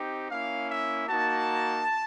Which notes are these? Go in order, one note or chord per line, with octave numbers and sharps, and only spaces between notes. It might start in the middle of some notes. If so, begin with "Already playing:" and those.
Already playing: C4 D#4 G4
A#3 C#4 E4 F5
E5
A#3 D#4 F#4 A5